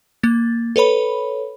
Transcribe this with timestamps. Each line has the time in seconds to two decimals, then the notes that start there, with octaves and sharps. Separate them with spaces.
0.23 A#3 A6
0.76 A4 B4 C#5 B5